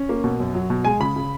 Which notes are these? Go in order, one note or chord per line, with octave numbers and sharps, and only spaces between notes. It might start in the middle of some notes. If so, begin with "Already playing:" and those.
Already playing: C#4
A#3
B2
F#2
F#3
B2
G#3 G#5
C#3 B5
C#3